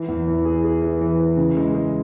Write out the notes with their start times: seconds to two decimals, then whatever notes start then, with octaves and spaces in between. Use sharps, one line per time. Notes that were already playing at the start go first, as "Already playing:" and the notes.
Already playing: E3
0.08 E2
0.27 E3
0.45 G#4
0.64 G#4
0.82 E3
1.01 E3
1.20 E3
1.37 C#3
1.57 G#3
1.75 G#3